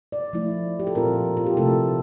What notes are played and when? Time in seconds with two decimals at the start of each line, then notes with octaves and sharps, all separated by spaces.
0.12 D5
0.33 F3 A3 E4
0.79 G4
0.87 A4
0.95 A#2 F3 C4 F4 A#4
1.37 F4
1.46 G4
1.57 C3 F3 A3 E4 A4